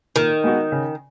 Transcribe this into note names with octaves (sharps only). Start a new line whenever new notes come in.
A#2 D#3
G#3 B3 F#4
C#3